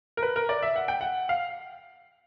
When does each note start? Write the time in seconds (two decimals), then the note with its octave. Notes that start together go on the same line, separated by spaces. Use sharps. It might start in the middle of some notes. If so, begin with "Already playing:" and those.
0.17 A#4
0.22 B4
0.36 A#4
0.49 D5
0.63 E5
0.76 F#5
0.88 G5
1.01 F#5
1.29 F5